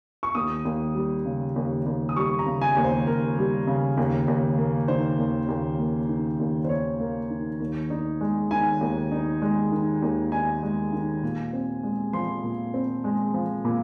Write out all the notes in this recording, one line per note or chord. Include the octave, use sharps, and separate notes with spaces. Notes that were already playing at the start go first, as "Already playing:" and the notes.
C#6
D#2 D#6
D#2
G3
C#3
D#2
D#2
D#6
G3 C#6
A#5
C#3
G#5
D#2
C5
D#2 A#4
G3
C#3
D#2
D#2
A#3
D#3 C5
D#2
D#2
A#3
D#3
D#2
C5
D#2 C#5
A#3
D#3
D#2
D#4
G#3
D#3 G#5
D#2
D#4
G#3
D#3
D#2
D#4 G#5
G#3
D#3
A#2
C4
G#3
F3 C6
A#2
C4
G#3
F3
A#2